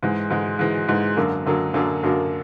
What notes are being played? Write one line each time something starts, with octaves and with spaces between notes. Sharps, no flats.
G#2 E3 G#3
G#2 E3 G#3
G#2 E3 G#3
G#2 E3 G#3
F#2 D3 F#3 A#3
F#2 D3 F#3 A#3
F#2 D3 F#3 A#3
F#2 D3 F#3 A#3